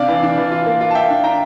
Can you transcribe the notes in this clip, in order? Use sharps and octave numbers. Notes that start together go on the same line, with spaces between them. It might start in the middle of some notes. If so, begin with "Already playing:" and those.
Already playing: C3 D4 D5 F5
E3
D4
E3
F4
A#3
F4
A5
F4 E5 G5
D4
D4 G5 A#5